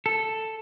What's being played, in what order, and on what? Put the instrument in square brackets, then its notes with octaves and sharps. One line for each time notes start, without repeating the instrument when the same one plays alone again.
[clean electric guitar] A4